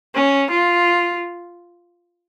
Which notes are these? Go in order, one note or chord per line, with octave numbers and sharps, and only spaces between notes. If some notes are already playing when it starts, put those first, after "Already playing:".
C#4
F4